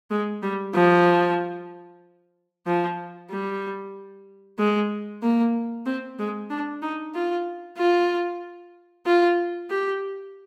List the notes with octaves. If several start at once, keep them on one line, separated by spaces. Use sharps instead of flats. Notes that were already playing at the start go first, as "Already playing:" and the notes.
G#3
G3
F3
F3
G3
G#3
A#3
C4
G#3
D4
D#4
F4
F4
F4
G4